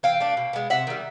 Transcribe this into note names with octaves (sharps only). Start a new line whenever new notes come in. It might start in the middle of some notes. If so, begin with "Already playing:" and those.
E3 F5 G5
A3 D4
B2
G#3 B3
C3 E5 F#5
D#3 G3